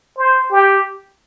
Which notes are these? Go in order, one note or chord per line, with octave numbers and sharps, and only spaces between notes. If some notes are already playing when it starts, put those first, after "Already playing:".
C5
G4